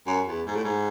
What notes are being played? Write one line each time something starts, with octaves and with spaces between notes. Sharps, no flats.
F#2
E2
G#2
A2
G#2